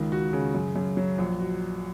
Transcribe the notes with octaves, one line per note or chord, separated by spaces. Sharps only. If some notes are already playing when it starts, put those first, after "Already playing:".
Already playing: C#2 D#3
F#4
C#3
F#2
F#2
F#3
A#1
F#4